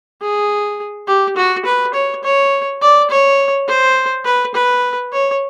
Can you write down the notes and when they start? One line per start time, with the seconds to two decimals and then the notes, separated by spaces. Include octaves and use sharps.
0.21 G#4
1.07 G4
1.36 F#4
1.65 B4
1.94 C#5
2.23 C#5
2.81 D5
3.10 C#5
3.67 C5
4.25 B4
4.54 B4
5.12 C#5